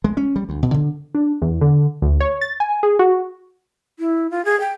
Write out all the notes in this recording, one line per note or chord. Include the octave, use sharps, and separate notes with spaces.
G#3
C#4
G3
D2
B2
D3
D4
E2
D3
D2
C#5
A6
G#5
G#4
F#4
E4
F4
G#4
G5